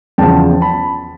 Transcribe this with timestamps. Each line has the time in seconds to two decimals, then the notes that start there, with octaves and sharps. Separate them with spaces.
0.18 E2 C#3 F3 G5 A5
0.61 A5 B5